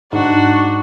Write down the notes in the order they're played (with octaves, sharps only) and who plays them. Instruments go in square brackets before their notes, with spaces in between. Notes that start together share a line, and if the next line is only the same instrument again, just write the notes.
[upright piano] G#2 [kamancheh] D4 F#4